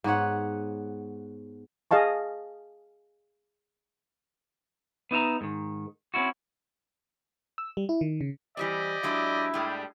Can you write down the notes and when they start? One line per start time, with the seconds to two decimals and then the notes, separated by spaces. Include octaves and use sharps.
0.04 G#2 B3 C#5 F#5
1.91 G#4 D#5 F5 A5 C#6
5.11 B3 D#4 E5 A#5
5.41 G#2 D#3
6.14 C4 C#4 E4 F#4
7.58 E6
7.77 G3
7.89 E4
8.01 D#3
8.21 C#3
8.57 E3 G3 C4 G4 D5 D#5
9.03 F#3 G#3 D4 E4
9.54 A2 G3 G#3